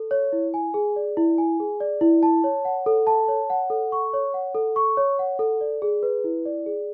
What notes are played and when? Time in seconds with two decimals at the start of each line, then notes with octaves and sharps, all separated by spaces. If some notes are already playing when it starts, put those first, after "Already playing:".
Already playing: A4
0.11 C#5
0.33 E4
0.54 G#5
0.74 G#4
0.96 D5
1.17 E4
1.38 G#5
1.60 G#4
1.80 D5
2.01 E4
2.23 A5
2.44 C#5
2.65 F#5
2.86 A4
3.07 A5
3.28 C#5
3.50 F#5
3.70 A4
3.92 C#6
4.13 C#5
4.34 F#5
4.55 A4
4.76 C#6
4.97 C#5
5.19 F#5
5.39 A4
5.61 D5
5.82 G#4
6.03 B4
6.24 E4
6.45 D5
6.66 G#4